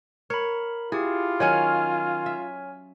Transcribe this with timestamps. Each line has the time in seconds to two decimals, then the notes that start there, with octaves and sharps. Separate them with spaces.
0.30 A#4 C#5 B5
0.92 E4 F4 G4 G#4
1.40 D#3 F#3 C#4 C#5 G#5 F6
2.26 E5